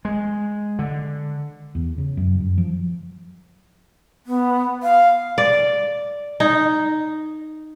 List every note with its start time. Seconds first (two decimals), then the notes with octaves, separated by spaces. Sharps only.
0.05 G#3
0.79 D3
1.75 E2
1.98 C#3
2.17 F#2
2.41 F#2
2.58 F3
4.26 B3
4.83 F5
5.38 D5
6.40 D#4